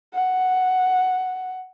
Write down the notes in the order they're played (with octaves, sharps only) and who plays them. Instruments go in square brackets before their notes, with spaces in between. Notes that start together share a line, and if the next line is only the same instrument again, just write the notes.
[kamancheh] F#5